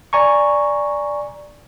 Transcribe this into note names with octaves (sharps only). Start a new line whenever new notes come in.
D5 G#5 A#5 C#6